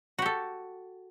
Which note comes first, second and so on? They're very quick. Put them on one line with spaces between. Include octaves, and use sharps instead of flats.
F#4 G4 A4